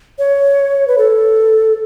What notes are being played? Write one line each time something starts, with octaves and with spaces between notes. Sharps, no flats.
C#5
B4
A4